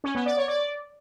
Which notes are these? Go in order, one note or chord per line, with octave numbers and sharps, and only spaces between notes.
C#4
B3
D5
C#5
D5